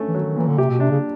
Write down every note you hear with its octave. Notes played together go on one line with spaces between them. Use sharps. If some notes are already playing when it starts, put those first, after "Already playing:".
Already playing: G2 A3 C#4
E3
D#3 F#3
D#3
A#2 E3
D3
C3 G4
B2
C3 D4
C#3